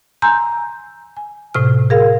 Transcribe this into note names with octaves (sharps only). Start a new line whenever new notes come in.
G#5 A#5 C6 E6 G6
G#5
A2 C3 F6
G#4 A#4 F5